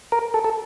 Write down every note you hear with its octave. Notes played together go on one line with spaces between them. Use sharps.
A#4
A4
A4